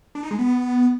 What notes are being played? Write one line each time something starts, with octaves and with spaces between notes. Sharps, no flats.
D4
D#4
G#3
B3